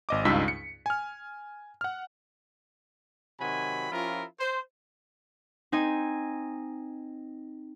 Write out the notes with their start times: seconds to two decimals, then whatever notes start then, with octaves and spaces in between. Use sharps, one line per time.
0.09 G#1 D#5 D6
0.25 C#2 G2 D#4 F4 E6 B6
0.48 C#7
0.86 G#5 F6
1.81 F#5 F6
3.40 C3 D#3 F#3 F#4 G#5 B5
3.92 F3 C#4 E4 F4 G4 A#4
4.40 C5
5.72 C4 D#4 G#5